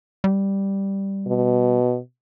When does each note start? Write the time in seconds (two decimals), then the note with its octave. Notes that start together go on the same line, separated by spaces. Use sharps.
0.24 G3
1.27 B2